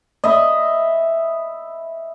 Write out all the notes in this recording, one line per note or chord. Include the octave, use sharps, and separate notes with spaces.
D#5 E5 B5